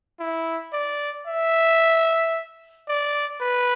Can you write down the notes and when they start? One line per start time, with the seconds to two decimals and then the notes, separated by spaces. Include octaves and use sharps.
0.20 E4
0.73 D5
1.28 E5
2.89 D5
3.41 B4